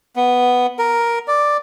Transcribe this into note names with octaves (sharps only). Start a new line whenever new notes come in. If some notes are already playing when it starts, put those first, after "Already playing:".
B3
A#4
D5